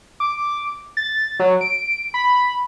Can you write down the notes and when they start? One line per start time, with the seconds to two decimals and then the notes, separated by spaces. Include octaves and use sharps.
0.20 D6
0.97 A6
1.40 F#3
1.61 D7
2.14 B5